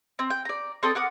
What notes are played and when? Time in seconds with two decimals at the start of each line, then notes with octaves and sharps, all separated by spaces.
0.19 C4
0.30 G5
0.45 D5 A#5
0.83 C4 A4 D5 D#6
0.95 A#4 F#5 D6 D#6